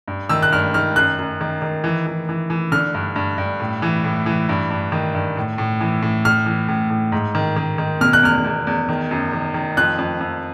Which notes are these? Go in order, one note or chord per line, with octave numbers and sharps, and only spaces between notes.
G2
D#3 E6
F#6
G2 F6
D#3 F6
F#2 F#6
F#2
D#3
D#3
E3
E3
E3
E3
D3 F6
G2
G2
G2
A2
E3
A2
E3
G2
G2
D#3
G2
A2
A2
E3
A2
A2 F6
E3
A2
A2
G#2
D#3
D#3
D#3
B2 F6
F#6
E2 F6
E2
E2
D#3
F#2
D#3
D#3
F2 F#6
F2
F2